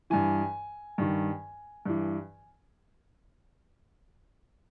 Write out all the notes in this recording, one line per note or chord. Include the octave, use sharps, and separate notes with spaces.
G2 E3 G#5
G2 D#3
G2 E3